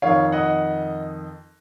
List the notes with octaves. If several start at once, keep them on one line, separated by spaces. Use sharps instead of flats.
F2 D#3 C#5 F5
D#5 F#5